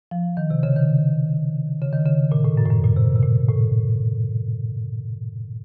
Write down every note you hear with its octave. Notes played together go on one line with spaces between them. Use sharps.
F3
D#3
C3
C#3
D#3
C#3
D#3
C#3
A#2
A2
F#2
A2
F#2
A#2
C3
C3
A#2
A2